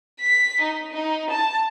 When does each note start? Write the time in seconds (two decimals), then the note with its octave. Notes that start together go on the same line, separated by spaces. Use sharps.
0.20 B6
0.61 D#4
0.92 D#4
1.30 A5